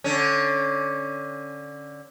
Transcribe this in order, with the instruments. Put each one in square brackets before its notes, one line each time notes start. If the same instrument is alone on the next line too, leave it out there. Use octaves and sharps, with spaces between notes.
[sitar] D3 C#4